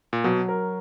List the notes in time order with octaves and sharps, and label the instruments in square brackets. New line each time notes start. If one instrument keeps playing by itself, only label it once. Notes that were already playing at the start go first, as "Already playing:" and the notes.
[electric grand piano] A#2
[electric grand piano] B2 [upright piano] F#3
[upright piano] A#4